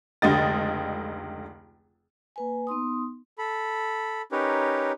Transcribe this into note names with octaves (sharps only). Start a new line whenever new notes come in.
F1 C#2 D3 D#5 A6
A#3 B4 G#5
B3 D#4 C6 D#6
A4 B5
C#4 D#4 G4 A#4 B4 C#5